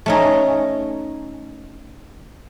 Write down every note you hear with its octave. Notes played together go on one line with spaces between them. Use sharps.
A3 C#4 D#4